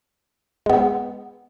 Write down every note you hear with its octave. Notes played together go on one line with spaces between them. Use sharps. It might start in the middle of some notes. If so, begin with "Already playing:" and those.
G#3 B3